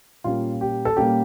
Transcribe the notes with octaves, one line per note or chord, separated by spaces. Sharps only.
A#2 G3 A#3 C#4 F4
G4
A4
A#2 G3 A#3 C#4 G4